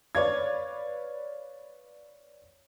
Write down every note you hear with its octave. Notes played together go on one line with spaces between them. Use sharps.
B4 C#5 D5 F5 G#6